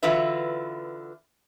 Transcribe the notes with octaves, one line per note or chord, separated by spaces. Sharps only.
D3 E3 F4 F#4 B4 E5